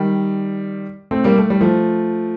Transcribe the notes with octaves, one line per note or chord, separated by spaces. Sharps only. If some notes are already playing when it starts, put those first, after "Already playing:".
Already playing: D#3 G3
A3 C4
G3 A#3
A3
G3
F3 A3